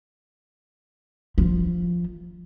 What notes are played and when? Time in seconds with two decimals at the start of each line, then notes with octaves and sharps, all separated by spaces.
1.38 F3